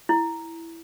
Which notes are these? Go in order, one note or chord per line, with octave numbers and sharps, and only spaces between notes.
E4